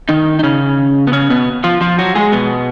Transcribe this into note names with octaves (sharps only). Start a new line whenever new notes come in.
D#3 D#4
D#4
C#3 C#4
B3
C#3 C#4
B2 B3
F3 F4
F3 F4
F#3 F#4
G#3 G#4
B2 B3